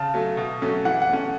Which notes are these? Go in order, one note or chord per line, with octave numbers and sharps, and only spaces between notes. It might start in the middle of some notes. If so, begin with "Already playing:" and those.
Already playing: C#3 A5
F#3 A3
B2
F#3 A3 C#4
E3 F#5
F#5
A3 C#4